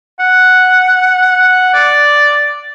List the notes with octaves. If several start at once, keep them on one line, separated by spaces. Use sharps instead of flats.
F#5
F#5
D5